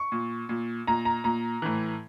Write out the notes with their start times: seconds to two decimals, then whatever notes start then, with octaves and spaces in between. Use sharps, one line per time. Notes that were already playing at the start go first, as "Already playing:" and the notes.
Already playing: C#6
0.12 A#2
0.49 A#2
0.87 A#2 A#5
1.05 A#5
1.24 A#2 A#5
1.62 A2 E3